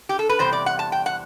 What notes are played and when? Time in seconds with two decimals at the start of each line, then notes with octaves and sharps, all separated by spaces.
0.09 G4
0.19 A4
0.29 B4
0.39 E2 C3 G3 C5
0.53 D5
0.66 F#5
0.79 A5
0.92 G5
1.06 F#5